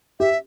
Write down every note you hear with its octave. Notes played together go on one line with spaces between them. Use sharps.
G4 E5